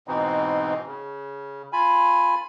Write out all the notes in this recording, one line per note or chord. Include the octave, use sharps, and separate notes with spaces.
G#2 B2 E3 C4 D#4
C#3
F4 G#5 B5